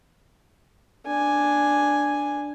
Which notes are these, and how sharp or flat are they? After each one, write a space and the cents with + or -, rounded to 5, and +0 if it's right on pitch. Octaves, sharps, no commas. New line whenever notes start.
D4 +0 G#5 +0